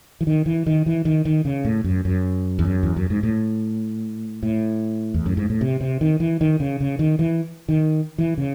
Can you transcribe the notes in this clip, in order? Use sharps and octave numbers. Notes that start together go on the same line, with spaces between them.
E3
D#3
E3
D#3
E3
D#3
D#3
C#3
A2
F#2
F#2
E2
F#2
E2
F#2
G#2
A2
A2
E2
F#2
G#2
A2
C3
C3
D#3
E3
D#3
C#3
C#3
D#3
E3
D#3
E3
C#3